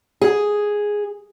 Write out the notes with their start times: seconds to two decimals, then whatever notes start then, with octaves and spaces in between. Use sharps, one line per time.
0.22 G#4